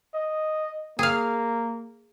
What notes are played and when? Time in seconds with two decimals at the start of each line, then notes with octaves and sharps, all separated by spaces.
0.14 D#5
0.99 A#3 G#4 F5